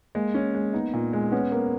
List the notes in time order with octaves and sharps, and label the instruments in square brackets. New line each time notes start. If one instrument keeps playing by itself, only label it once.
[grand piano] G#3 [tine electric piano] A#3
[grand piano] C#4
G#3
[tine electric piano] B3 [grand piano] D#4
[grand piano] A#2
G#3
[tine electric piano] B3 [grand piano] C#4
[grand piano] A#3